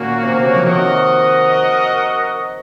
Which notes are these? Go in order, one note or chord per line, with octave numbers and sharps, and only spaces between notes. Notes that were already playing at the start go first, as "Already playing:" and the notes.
Already playing: A#2 D#3 A#3 C#4 F#4
C3
C3
C#3
F3
C3 D#3 F#4 A#4 D#5 F#5